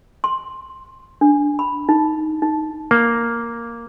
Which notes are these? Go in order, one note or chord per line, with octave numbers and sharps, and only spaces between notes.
C6
D4
B5
D#4
D#4
A#3